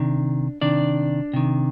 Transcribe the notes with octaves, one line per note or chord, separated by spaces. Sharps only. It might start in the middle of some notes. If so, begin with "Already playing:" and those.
Already playing: C3 D#3 D4
C3 D#3 D4 D5
C3 D#3